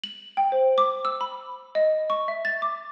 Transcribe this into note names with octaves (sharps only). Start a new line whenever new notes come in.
F#7
G5
C5
D6
E6
B5
D#5
C#6
E5
A6
D6